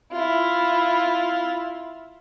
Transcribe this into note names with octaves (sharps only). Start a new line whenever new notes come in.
E4 F4